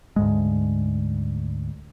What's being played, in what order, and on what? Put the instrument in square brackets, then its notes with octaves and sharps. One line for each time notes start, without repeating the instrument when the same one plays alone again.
[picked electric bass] D2 G#2 G#3